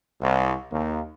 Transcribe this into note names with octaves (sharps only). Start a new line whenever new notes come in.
C2
D#2